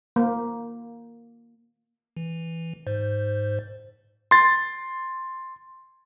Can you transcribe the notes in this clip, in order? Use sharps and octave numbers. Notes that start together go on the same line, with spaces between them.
A#3
E3
G#2 C5
C6 A6